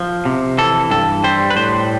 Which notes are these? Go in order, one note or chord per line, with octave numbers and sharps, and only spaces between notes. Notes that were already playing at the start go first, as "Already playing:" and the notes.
Already playing: F3
C3
E3 A4
G2 A4
G3 C5
B4
A2 C5